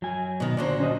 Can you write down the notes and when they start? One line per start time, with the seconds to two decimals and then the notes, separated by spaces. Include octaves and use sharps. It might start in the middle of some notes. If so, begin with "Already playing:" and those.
0.02 F#3 G#5
0.40 B2 D#3
0.57 A#2 D3 F#3 C5 D5
0.80 C#4 C5 D#5